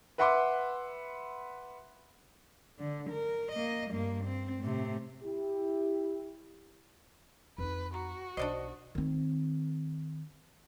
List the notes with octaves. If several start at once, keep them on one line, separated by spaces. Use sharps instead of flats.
B4 E5 F#5 B5 C6 D6
D3
A#4
A#3 D#5
G2 A#3
C4
A2 C3
E4 G4
F2 D#4 B4
F#4 A#5
B1 D4 C5 D5 D#5
D#3 C4